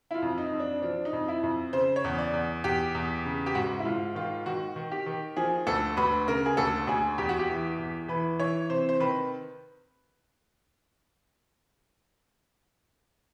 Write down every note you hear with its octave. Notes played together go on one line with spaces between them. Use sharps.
E4
F4
F2
D#4
F2
D4
F3 D4
D#4
F2
E4
F2
C#3 C5
C#5
E2
D5
E2
E2 G4
E2
C#3
G4
G#2 F#4
E4
G#2 F4
D#3 F4
D#3 F#4
D#3
G4
D#3
F3 G#4
D2 A4
D2 B4
C#3 A#4
G#4
D2 A4
D2 G#4
E2 G4
F#4
G4
E3
E2
E3 B4
E3 C#5
C3 C5
C5
D#3 B4